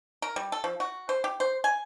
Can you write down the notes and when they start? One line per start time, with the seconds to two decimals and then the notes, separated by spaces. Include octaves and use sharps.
0.22 A#4
0.36 G3
0.52 A4
0.64 F3
0.80 F#4
1.09 C5
1.24 G4
1.40 C5
1.64 G#5